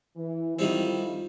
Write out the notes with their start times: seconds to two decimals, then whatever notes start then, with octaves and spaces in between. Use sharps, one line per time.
0.17 E3
0.59 F2 D#3 G3 C4 E4 F4